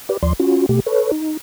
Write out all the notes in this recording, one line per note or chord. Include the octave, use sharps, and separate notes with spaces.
G4 B4 D5
D#2 F3 D5 C6
C#4 F4 F#4
B2 A3 G4
A4 B4 C#5
D#4